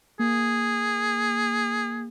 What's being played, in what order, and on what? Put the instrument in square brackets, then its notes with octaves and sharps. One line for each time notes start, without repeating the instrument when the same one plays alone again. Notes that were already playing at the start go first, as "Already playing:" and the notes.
[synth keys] A#3 [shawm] G#4